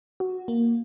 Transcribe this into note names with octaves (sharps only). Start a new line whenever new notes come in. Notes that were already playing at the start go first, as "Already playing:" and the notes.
F#4
A#3